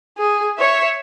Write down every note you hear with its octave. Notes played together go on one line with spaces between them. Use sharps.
G#4
C#5 E5